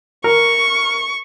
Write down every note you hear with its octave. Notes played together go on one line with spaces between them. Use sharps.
A#4 C#6